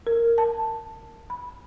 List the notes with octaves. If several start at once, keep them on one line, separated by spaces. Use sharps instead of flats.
A#4
A5
B5